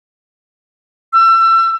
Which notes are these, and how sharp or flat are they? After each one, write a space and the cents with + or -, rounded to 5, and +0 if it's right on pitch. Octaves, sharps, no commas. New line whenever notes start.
E6 +30